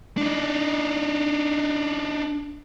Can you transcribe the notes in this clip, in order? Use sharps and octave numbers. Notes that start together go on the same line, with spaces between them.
D4 D#4